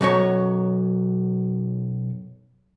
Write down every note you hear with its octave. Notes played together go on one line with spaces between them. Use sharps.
B1 F#2 F#3 C#5